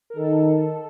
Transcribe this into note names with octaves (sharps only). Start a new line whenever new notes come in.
A#4
D#3 A4